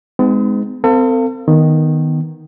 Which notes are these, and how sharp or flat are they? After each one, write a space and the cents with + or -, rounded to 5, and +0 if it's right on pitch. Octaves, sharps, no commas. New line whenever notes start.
G#3 +0 B3 +45 D#4 +0
C4 -30 A4 +40 F5 -10
D#3 +0 B3 +0